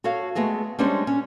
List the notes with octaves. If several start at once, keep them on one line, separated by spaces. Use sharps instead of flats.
F#4 A4 C#5 F5
G#3 A3 B3 G#4 D#5
G3 G#3 C#4 D4 C5 C#5
C#4